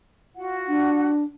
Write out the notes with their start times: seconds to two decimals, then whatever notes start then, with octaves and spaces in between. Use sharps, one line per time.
0.36 F4 F#4 F#5
0.68 D4